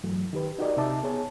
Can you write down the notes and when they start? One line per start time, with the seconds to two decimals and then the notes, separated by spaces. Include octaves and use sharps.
0.04 G2 E3 F#3 A3
0.33 D#3 G4 B4
0.59 D#4 F#4 G4 A#4 D5 D#5
0.77 C3 D#4 E5 A5 D6
1.03 B3 G#4 C#5 A5